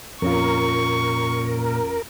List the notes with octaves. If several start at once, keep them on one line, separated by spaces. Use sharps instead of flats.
F2 A#2 C#4 F4 A#4 C#6